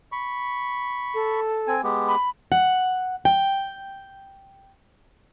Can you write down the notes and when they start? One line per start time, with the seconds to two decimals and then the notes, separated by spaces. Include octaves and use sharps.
0.12 B5 C#6
1.14 A4
1.67 C4 G#5
1.83 G#3 B3 G4
2.08 B5
2.52 F#5
3.25 G5